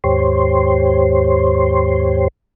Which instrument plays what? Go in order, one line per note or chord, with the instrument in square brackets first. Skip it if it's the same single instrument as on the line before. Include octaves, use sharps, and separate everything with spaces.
[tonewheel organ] D#2 G#2 G4 C5 C#5 C6